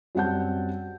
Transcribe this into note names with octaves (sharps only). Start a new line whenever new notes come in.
F#2 G3 C4 F#5 A5 G6